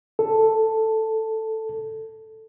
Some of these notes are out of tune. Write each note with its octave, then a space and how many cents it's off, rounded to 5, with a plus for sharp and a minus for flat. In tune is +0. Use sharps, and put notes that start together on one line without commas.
A4 +5